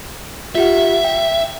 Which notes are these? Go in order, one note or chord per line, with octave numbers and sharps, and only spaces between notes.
F4 G4 E5 F#5
G5